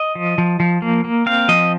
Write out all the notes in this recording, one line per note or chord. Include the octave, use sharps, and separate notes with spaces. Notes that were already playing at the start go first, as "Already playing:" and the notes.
Already playing: D#5
F3
F3
F3
A#3
A#3
C4 F5
F3 D#5